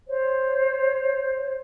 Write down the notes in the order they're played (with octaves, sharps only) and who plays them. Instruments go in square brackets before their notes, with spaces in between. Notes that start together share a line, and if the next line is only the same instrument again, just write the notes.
[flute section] C5 C#5